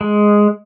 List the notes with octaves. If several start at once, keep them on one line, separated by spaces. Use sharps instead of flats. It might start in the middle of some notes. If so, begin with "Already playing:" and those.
G#3